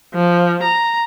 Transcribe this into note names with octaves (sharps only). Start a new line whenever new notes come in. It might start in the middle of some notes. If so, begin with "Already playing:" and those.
F3
A#5